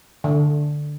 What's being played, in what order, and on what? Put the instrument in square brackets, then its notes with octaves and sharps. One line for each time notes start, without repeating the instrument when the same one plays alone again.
[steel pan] D3